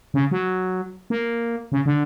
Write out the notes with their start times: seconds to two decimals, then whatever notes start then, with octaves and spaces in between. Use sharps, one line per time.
0.14 C#3
0.31 F#3
1.10 A#3
1.72 C#3
1.86 D3